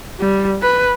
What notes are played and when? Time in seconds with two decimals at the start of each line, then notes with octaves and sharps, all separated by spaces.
0.20 G3
0.62 B4